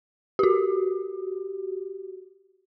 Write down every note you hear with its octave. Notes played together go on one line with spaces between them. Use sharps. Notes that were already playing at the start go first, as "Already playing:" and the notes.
F#4 G4